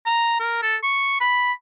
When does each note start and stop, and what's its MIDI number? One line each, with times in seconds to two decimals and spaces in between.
0.06 0.36 82
0.40 0.62 70
0.62 0.76 69
0.83 1.18 85
1.21 1.52 83